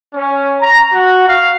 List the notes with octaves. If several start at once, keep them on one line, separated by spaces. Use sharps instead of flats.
C#4
A#5
F#4
F5